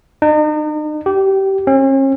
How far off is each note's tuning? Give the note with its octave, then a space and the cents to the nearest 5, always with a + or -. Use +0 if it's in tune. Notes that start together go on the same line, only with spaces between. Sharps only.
D#4 -40
G4 -20
C#4 -45